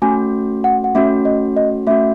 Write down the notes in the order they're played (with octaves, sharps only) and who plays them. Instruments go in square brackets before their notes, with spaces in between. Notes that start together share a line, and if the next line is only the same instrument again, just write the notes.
[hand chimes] A3 C#4 F#4 [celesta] G#5
[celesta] F#5
F#5
[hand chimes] A3 C#4 F#4 [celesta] E5
[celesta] D#5
D#5
[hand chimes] A3 C#4 F#4 [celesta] E5